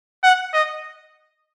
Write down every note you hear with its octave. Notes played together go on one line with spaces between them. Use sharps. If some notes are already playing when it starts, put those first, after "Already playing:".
F#5
D#5